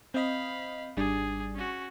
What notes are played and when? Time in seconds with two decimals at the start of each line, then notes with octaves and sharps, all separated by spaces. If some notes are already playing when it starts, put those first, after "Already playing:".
0.14 C4 D#5 F5 B5
0.97 G#1 G3 D4 G#4
1.55 C#4 F#4